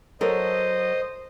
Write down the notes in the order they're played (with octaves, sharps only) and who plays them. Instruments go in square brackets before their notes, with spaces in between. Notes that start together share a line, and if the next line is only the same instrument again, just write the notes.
[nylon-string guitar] F#3 A4 A#4 [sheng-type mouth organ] C5 D#5